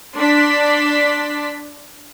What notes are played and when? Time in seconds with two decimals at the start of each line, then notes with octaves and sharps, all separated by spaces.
0.17 D4 D5 C6 B6